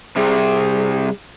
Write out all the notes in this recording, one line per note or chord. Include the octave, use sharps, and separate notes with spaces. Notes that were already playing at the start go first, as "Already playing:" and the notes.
C3 G3 G#4